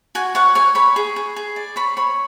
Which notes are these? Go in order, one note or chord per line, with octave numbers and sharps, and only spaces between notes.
F#4 G#5
C#5 F#5
C#5 G#5
C#5 B5
G#4
G#4
G#4
D5
C#5 B5
C#5 B5